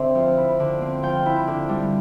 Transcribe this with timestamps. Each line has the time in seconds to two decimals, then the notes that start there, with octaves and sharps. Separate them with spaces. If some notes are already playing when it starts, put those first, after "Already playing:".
Already playing: D3 C4 C5 E5
0.15 F3
0.37 E4
0.60 D3
0.81 C4
1.03 F3 G5
1.26 E4
1.47 D3
1.69 G3